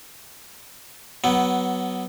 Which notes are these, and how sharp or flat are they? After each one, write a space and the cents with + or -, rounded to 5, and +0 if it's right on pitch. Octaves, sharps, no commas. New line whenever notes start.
F#3 +15 B3 +0